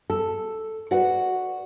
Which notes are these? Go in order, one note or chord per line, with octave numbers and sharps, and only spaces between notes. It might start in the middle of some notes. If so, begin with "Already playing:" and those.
A4
F#4 B4 D5 F#5